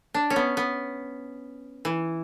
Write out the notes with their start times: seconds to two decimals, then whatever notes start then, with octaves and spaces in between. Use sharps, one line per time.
0.14 D4
0.30 C#4
0.36 B3
0.57 B3
1.85 E3